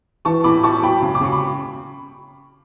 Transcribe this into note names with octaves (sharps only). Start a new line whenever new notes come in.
E3 A5 C#6
A2 B5 D6
A2 A5 C#6
F#3 G5 B5
C#3
D6
C#3 C#6
B5